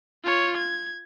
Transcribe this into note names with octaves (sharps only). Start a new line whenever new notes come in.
F4 C#5
G#6